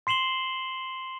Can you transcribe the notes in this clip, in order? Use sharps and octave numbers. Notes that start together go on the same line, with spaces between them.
C6 C7 E7 F#7 G7